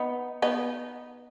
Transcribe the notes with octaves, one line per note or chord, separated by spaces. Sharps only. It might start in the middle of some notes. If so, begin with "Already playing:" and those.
Already playing: B3 D#4
B3 D#4